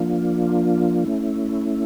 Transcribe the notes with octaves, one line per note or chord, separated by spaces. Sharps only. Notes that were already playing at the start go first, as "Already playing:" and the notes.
Already playing: F3 A#3 D4 F4
A3 C#4 E4